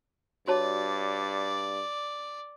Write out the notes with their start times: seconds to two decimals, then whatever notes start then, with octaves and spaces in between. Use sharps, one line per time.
0.48 G2 F#4 C#5 D5 A5